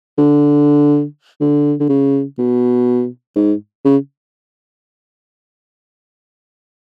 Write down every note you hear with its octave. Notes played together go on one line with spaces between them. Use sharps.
D3
D3
D3
C#3
B2
G#2
C#3